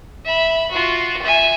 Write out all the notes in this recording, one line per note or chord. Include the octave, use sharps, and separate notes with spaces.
E5 B5
F4 F#4
E5 G#5